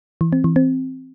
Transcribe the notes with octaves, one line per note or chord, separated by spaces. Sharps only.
E3
C4
E3
C4